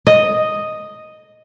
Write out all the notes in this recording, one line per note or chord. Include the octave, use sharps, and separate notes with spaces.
D#5